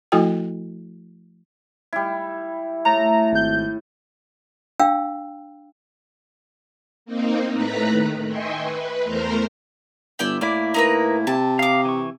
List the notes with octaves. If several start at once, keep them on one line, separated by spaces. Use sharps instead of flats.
F3 A3 E4 F#4 A4 G5
G3 E4
A2 A#5
G#1 G6
D4 F5 G5 E6
A#3 C4 D#4
A2 A3 B4 A#5 B5 F#6
D#3
D#5 E5 G5 G#5 C6 C#6
B4
E2 A3 A#4 C5 A#5
G1 E4 D5 G5
A2 A3 A#3 E4 D5
D#4 A#4 B4
C3 A5
D#4 F5 D6
E3 C#6